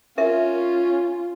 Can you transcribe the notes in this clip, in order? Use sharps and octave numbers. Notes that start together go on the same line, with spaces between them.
C#4 F4 A#4 E5